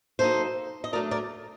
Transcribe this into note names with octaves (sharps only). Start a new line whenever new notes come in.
F#3 A#3 D#4 A4 C5
D#5
F#3 A3 D4 A#4 D5
A#4 D5